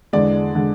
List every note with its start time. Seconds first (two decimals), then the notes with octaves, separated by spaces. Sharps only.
0.13 E2 D3 G#3 D5
0.55 D3 G#3